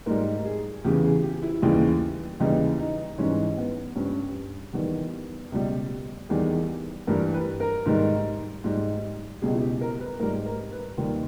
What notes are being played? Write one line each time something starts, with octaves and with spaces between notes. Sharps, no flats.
G#2 G3 A#4
G#4
E2 C#3 E3 G4
G#4
G4
E4
D#2 C#3 E3 G3
D#2 C#3 E3 G3 D#4
D#4
G#2 E3 G3 C#4
B3
G2 G3 C#4
E2 D#3 G3 B3
C#2 B2 G3
E2 D#3 G3 G#4
G2 E3 G3 A#4
B4
A#4
G#2 D#3 G3
G#2 G3
C#2 B2 G3 G#4
E4
G4
A#4
B4
G#2 G3 A#4
A#4
B4
D#2 D#3 G3 A#4